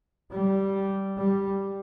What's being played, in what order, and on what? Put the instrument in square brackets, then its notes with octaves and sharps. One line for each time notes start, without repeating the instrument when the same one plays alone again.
[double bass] G3
G3